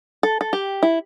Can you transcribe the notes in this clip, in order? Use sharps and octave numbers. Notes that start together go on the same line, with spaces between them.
A4
A4
G4
E4